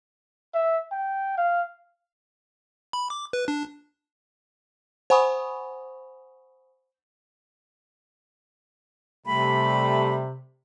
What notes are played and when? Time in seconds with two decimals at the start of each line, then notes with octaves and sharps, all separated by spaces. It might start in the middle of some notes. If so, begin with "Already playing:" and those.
0.54 E5
0.92 G5
1.38 F5
2.93 B5
3.10 D6
3.33 B4
3.48 D4
5.10 C5 F#5 G#5 B5 C#6 D#6
9.26 C3 G3 A3 B5